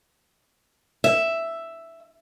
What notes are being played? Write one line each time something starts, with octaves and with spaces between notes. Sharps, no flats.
E5